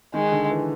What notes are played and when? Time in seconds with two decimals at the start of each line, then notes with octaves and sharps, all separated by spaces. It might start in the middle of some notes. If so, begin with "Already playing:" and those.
0.14 D#3 G#3
0.32 D3
0.50 E3